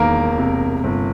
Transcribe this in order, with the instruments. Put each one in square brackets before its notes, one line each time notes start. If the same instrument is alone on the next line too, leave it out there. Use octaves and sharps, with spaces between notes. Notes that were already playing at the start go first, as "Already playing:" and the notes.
Already playing: [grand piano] E1 D#3 [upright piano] A#3 A#4
[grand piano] C3
G1